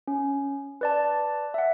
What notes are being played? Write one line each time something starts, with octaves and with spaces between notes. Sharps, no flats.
C#4
B4 D5 A5
E5 F#5